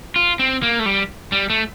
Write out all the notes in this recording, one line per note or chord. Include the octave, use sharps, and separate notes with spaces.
F4
C4
A#3
A3
G3
G3
A3